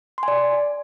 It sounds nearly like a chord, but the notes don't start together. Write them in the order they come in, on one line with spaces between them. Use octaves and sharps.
C6 G#5 D5